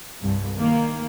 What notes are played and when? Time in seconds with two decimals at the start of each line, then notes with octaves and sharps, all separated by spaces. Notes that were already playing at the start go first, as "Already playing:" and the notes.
0.21 C2 G2
0.58 D#3 A#3